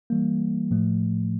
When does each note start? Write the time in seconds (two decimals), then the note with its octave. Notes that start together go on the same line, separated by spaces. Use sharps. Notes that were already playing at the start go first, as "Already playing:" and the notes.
0.10 E3 G3 A#3
0.71 A2 F3 A3